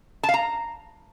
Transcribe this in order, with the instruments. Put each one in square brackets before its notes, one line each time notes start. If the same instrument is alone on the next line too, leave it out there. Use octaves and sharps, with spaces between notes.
[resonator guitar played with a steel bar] A5
F5
A#5